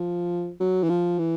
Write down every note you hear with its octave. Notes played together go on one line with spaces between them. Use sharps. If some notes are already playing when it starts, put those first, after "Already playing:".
Already playing: F3
F#3
E3
F3
E3